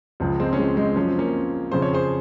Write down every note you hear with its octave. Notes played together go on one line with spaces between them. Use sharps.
C#2 C#3 F3
G#3 C4
C#4
G#3 C4
G#3 C4
F#2 F3 C#4
C4
A#3 C#4
F2 C#3 F3 C5
C#5
G#4 C5